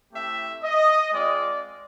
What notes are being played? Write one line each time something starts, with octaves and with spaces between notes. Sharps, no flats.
A3 C4 E4 G4 E5
D#5
G#3 C4 F4 D5